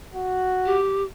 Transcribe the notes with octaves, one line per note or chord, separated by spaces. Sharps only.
F#4
G4